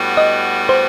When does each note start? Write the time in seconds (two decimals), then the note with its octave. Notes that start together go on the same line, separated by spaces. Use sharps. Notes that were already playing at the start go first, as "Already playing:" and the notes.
Already playing: A2 G3 B3 F#4
0.17 D#5
0.69 C5